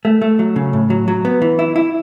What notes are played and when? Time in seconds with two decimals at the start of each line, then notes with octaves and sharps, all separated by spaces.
0.05 A3
0.22 A3
0.39 F#3
0.56 C#3
0.73 A2
0.90 F#3
1.08 F#3
1.25 B3
1.42 E3
1.59 E4
1.76 E4